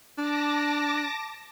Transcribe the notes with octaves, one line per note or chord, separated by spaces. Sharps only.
D4 A5 D6 A#6